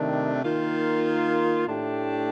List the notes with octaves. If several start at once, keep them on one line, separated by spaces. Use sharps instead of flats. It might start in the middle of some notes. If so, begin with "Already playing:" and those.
Already playing: C3 D#3 A3 D4
D#3 A#3 F4
A2 A3 D4 G4